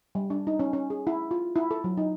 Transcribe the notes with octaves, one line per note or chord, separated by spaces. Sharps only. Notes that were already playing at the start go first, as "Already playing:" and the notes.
G3
D4
D#4
C#4
C#4
G#4
E4
F4
E4
A4
F#3
D#4